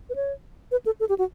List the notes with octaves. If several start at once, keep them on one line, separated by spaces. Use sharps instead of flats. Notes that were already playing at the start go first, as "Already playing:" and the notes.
B4
C#5
B4
A4
A4
G4
F#4